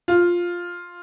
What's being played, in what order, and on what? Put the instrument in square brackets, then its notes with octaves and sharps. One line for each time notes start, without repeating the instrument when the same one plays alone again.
[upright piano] F4